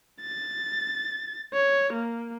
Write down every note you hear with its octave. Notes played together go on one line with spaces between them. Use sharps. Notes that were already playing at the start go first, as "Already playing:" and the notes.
A6
C#5
A#3